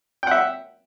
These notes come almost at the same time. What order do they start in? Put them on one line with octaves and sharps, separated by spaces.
G5 F#5 E5